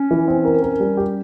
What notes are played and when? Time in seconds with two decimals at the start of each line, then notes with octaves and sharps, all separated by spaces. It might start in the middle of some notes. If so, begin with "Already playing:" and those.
Already playing: C#4
0.11 E3
0.28 C4
0.45 A#4
0.62 A#4
0.80 G3
0.97 G4